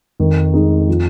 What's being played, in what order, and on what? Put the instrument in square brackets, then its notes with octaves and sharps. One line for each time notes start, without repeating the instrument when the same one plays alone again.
[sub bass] F2 [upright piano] D#3
[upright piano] G#3 D#4
F3